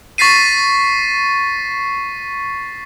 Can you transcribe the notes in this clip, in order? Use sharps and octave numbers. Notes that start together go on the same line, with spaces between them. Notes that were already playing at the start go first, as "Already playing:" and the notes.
C#6 A6 B6 C7 D#7